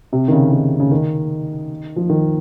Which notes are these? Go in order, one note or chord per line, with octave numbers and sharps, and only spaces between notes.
C3
D#3
C#3
D#3
C#3
D#3
F3
D#3